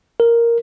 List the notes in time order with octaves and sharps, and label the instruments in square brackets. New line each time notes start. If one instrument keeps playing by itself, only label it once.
[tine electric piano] A#4